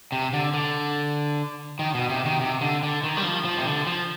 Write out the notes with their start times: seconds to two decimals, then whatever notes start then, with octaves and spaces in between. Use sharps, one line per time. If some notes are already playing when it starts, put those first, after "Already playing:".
0.12 C3
0.33 D3
0.54 D3
1.79 D#3
1.94 B2
2.10 C3
2.26 D#3
2.41 C3
2.61 D3
2.83 D3
3.04 D#3
3.17 G3
3.24 F3
3.45 F3
3.57 C3
3.66 D3
3.87 F3